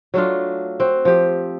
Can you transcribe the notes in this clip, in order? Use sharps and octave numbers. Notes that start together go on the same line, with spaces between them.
F#3 A3 D4 F4
C4 F#4
F3 G4